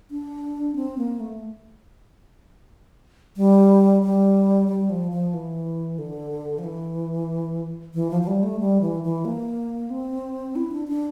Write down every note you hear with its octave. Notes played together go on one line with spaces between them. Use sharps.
D4
C4
A#3
A3
G3
G3
G3
F3
F3
E3
D3
F3
E3
E3
F3
F3
G3
A3
G3
E3
E3
A#3
C4
E4
D4
D4